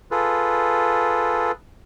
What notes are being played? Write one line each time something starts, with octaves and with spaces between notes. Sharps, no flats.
F4 G#4 A4 B4